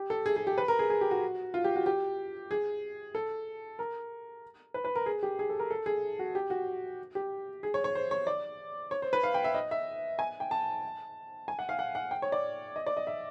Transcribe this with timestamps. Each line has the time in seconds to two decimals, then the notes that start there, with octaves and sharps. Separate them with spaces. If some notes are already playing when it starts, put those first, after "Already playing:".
Already playing: G4
0.10 A4
0.26 G#4
0.36 G#4
0.47 G4
0.58 B4
0.68 A#4
0.79 G#4
0.90 G#4
1.01 G4
1.11 F#4
1.54 F4
1.64 G4
1.76 F#4
1.86 G4
2.51 G#4
3.15 A4
3.79 A#4
4.74 B4
4.85 B4
4.96 A#4
5.06 G#4
5.23 G4
5.39 G#4
5.50 A4
5.59 A#4
5.71 A4
5.86 G#4
6.19 F#4
6.35 G4
6.50 F#4
7.15 G4
7.63 G#4
7.74 C#5
7.84 C#5
7.95 C5
8.11 C#5
8.27 D5
8.91 C#5
9.02 C5
9.13 B4
9.23 F5
9.34 G5
9.44 E5
9.55 D#5
9.71 E5
10.19 G#5
10.40 G5
10.51 A5
11.48 G#5
11.59 F#5
11.69 F5
11.79 F#5
11.95 F#5
12.11 G5
12.22 C#5
12.32 D5
12.76 D#5
12.86 D5
12.97 D#5
13.07 E5